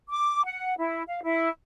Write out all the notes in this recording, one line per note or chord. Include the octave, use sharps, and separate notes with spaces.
D6
F#5
E4
F5
E4